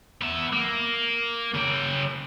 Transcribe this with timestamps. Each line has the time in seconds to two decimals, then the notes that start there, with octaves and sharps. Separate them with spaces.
0.22 B3 E5
0.53 A#3
1.55 C#3 G5